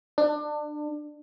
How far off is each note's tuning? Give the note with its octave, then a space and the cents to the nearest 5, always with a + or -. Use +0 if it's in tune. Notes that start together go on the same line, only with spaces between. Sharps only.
D4 +25